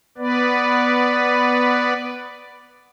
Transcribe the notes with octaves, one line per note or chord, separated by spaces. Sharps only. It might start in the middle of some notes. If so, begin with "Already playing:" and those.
B3 B4 D5